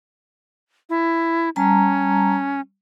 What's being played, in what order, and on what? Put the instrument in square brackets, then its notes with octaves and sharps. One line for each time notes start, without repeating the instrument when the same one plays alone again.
[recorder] E4
[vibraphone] G3 A5 A#5 [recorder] C#4